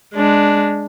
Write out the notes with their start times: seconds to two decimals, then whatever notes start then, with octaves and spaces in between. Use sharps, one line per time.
0.14 G#3 D4